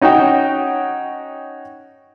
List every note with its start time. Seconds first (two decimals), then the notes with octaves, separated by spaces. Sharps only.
0.01 C#4 D#4 F#4 C#5 G5